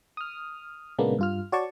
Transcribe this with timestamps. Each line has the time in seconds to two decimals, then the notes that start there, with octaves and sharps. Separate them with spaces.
0.17 D#6 F6
0.98 A#2 C#3 G#3 A#3 B3 D4
1.19 G2 F4 F6
1.52 F#4 C#5 D5 A5 C#6